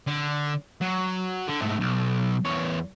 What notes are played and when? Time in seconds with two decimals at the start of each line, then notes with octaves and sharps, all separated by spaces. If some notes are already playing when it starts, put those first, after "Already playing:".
0.07 D3
0.81 F#3
1.48 D3
1.61 G#2 A3
1.80 B1
2.45 E2 C#5